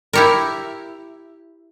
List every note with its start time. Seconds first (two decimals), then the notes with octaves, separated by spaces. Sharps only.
0.13 E4 G4 A#4